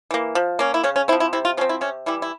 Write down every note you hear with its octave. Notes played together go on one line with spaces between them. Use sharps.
E3 A#3
F3
A#3 C#4
E4
C#3 C#4
C#4
F3 C4 E4
E4
C3 E4
F4
F3 C4 C#4
E4
C3 C#4
E3 G3 E4
E4